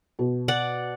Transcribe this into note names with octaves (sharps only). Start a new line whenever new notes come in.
B2
D5 F#5